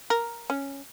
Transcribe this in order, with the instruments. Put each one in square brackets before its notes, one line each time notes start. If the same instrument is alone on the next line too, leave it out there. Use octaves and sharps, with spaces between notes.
[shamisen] A#4
C#4